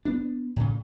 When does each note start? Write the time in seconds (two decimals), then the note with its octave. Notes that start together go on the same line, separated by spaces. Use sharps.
0.05 B3 D4
0.56 A2 C#3